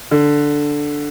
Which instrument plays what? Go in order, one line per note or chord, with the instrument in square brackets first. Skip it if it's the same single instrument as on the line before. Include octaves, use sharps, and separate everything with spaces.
[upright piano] D3